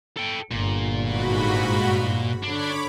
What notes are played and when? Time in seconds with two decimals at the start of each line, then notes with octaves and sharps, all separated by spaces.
0.17 A4 G5
0.51 G1 A#2
1.02 G#2 F#4 B5
2.44 D3 D4 C#5 B5 D6